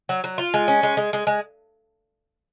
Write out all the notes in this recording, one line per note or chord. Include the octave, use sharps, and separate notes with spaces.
F#3
F#3
F4
G#3
C#4
G#3
G#3
G#3
G#3